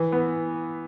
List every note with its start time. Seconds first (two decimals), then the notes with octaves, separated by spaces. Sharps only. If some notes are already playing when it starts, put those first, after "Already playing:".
Already playing: E3
0.12 B3